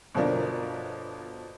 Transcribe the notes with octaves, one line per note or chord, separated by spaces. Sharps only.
G1 B2 F3 D4 A#4